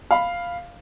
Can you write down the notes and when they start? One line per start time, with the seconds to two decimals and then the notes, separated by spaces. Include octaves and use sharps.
0.11 F5 B5